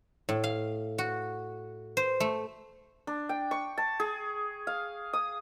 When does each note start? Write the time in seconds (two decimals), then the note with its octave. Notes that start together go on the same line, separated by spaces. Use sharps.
0.29 A2
0.44 F5
0.98 F#4
1.97 C5
2.20 A3
3.07 D4
3.29 G5
3.51 C#6
3.78 A5
4.00 G#4
4.67 F5
5.13 D#6